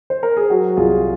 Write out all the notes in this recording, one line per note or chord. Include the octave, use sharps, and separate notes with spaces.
C5
A#4
G#4
F#3 F#4
C2 F4 G#4